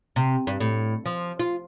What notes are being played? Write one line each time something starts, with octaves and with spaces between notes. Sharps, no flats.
C3
G2
A2
F3
F4